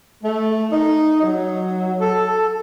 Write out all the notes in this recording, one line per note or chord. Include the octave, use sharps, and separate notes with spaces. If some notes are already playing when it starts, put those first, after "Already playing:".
A3
D#4
F#3
A4